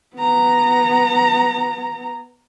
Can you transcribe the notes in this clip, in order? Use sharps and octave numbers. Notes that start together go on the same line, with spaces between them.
B3 A#5